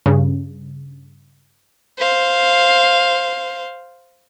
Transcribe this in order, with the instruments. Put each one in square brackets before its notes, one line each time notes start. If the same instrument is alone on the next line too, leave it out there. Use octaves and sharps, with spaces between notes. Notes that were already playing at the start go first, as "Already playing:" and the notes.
[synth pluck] G2 C#3
[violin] C5 F5